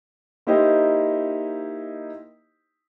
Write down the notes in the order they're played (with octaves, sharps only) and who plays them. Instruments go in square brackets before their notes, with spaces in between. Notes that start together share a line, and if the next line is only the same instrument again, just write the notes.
[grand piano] A#3 D#4 E4 G4 C5 D#5